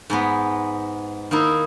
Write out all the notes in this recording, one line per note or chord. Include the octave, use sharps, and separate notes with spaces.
G#2 G#3 B3
D#3 A#3 D#4 E4